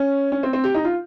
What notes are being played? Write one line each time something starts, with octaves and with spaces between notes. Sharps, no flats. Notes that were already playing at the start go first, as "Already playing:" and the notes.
Already playing: C#4
C#4
C4
C4
G4
D#4
F4